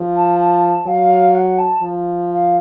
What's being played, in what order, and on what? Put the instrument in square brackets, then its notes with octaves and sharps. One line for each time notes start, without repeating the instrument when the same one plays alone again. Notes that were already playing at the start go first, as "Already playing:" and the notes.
Already playing: [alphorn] F3
[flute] A5
A5
[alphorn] F#3 [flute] F5
[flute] F#5
A5
[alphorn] F3
[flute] F5